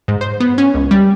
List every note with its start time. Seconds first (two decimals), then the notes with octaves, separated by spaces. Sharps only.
0.08 G#2
0.21 C5
0.40 B3
0.58 C#4
0.74 C#2
0.91 G3